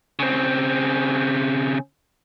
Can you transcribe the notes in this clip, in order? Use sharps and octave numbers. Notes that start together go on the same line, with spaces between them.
C#3 C4